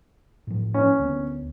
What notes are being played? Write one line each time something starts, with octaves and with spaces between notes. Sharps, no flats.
A2 F3
C#4
D2 A#3 B3